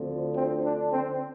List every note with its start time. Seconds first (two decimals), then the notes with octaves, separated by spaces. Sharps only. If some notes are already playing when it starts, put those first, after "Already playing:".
Already playing: D2 D3 F3 C4
0.35 C4
0.63 D4
0.92 C4